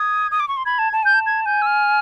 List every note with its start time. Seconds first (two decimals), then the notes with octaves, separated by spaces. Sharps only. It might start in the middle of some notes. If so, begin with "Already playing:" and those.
Already playing: D#6 G#6
0.31 D#6
0.40 D6
0.48 C#6
0.57 C6
0.65 B5 G#6
0.79 A5
0.93 A5
1.03 G#5 G6
1.14 A5
1.26 G#6
1.46 G#5 G6
1.62 E6
1.66 F6